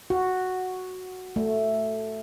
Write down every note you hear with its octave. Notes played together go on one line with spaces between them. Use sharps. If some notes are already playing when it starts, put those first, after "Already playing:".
F#4
A3